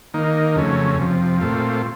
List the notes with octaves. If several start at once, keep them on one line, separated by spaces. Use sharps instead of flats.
D#3 A#3 D#4
F2 C#3 F#3 A3 C#4
F2 C3 F3
A#2 A3 C4 F4